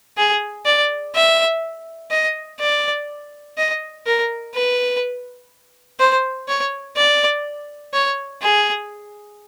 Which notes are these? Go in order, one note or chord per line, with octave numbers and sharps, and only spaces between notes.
G#4
D5
E5
D#5
D5
D#5
A#4
B4
C5
C#5
D5
C#5
G#4